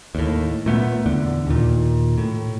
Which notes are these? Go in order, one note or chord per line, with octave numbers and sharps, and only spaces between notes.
D#2 A2
A#2 A3 B3
E2 D3
D#2 A#2
A2